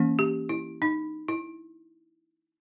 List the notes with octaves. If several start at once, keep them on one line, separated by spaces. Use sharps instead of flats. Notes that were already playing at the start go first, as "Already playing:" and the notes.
Already playing: E3 A#3 C#4
G4
E4
D#4
E4